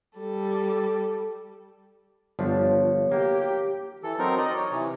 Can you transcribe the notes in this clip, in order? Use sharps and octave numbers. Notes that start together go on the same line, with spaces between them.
G3 A4
G1 F3 D4 C#5
A#3 G4
E3 A4
F#3 C4 D#4 A#4
D#4 D5 D#5
C#5
C3 E3